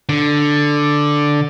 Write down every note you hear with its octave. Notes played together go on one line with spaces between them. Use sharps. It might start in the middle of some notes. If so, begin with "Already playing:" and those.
D3